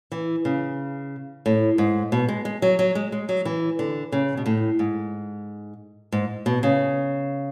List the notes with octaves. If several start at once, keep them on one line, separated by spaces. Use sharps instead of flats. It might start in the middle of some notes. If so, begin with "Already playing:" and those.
E3
C#3
A2
G#2
B2
G#3
G#3
F#3
F#3
G#3
G#3
F#3
E3
D3
C#3
B2
A2
G#2
G#2
B2
C#3